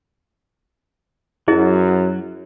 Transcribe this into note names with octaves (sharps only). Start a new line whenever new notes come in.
F#2 F#3 E4 G#4 D#5